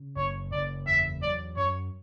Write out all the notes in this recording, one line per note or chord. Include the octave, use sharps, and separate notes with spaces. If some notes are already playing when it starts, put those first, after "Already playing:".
Already playing: C#3
F#1 C#5
F#1 D5
E2 E5
F#3 D5
F#2 C#5